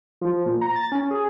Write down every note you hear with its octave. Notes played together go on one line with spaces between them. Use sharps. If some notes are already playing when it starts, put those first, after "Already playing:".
F3
A#2
A#5
A6
C#4
G#4